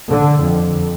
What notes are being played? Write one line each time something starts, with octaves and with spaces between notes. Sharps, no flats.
D3
F2